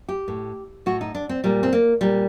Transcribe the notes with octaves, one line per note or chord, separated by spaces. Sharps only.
G4
A2
A2 F#4
D#4
D4
C4
A#2 G3
C4
A#3
A#2 G3